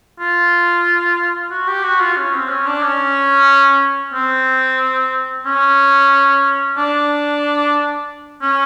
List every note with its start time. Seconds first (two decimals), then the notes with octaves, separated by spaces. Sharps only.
0.20 F4
1.51 F#4
1.67 G4
1.83 F#4
2.01 F4
2.17 C#4
2.33 C4
2.49 C#4
2.67 D4
2.83 C#4
4.14 C4
5.46 C#4
6.77 D4
8.42 C#4